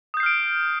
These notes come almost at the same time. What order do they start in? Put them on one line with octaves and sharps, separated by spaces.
D#6 G6 C7 F6 D7